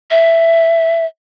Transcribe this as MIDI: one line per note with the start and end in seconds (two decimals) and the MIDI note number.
0.11 1.05 76